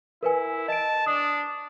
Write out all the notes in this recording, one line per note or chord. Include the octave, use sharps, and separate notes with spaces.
E4 A#4 B4 G#5
D#5 A5 D7
D4 D#6